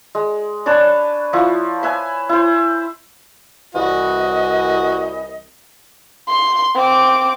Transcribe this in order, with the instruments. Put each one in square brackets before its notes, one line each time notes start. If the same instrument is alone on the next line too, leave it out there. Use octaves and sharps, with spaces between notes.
[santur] G#3
D4 B4 C#5 A5
F3 E4 C#6
B4 E5 G#5
E4 C5
[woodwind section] C2 E3 D#5 [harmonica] F#4
[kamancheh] C6
C4 D6